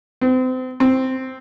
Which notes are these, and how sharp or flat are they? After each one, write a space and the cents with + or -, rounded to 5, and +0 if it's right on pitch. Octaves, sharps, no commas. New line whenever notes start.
C4 -35
C4 +0